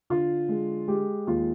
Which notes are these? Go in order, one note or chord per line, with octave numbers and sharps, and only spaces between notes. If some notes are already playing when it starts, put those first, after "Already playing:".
D3 F4
G#3
G#3 G4
D#2 F4